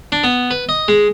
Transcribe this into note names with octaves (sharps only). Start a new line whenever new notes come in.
D4
B3
B4
D#5
G#3